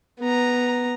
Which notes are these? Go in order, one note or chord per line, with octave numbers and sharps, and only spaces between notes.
B3 A#5